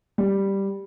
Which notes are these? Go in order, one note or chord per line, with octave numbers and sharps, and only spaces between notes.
G3